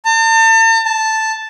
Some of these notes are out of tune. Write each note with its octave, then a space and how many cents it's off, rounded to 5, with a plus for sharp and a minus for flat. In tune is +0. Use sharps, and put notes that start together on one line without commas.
A5 +40
A5 +0